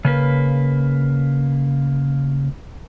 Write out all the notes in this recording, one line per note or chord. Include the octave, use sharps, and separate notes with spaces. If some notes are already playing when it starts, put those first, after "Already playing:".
C#3 A#3 B4